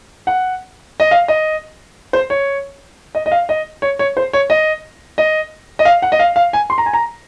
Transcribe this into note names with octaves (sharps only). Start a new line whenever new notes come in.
F#5
D#5
F5
D#5
C5
C#5
D#5
D#5
F5
D#5
C#5
C#5
C5
C#5
D#5
D#5
D#5
F5
F#5
D#5
F5
F5
G#5
C6
A#5
G#5
A#5